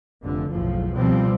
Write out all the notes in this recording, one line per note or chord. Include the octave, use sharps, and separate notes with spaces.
F1 D3
F#1 B1 A2 F3
C#2 B2 F3 G3 C4